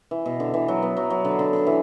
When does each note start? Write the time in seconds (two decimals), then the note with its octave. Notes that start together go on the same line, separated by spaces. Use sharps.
0.11 E3
0.26 B2
0.40 D3
0.54 E3
0.68 F#3
0.83 B3
0.97 F#3
1.10 F#3
1.25 D3
1.39 D3
1.53 D3
1.67 E3